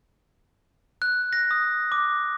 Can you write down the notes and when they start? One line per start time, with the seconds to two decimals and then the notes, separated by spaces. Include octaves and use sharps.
1.02 F#6
1.33 A#6
1.51 D#6
1.92 D6